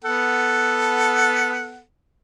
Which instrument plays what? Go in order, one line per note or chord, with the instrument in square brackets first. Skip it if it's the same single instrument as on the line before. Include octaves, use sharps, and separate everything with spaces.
[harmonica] B3 A4 F#5